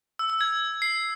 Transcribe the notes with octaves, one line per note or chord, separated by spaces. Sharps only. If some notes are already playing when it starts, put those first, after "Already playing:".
E6
E6
G#6
C7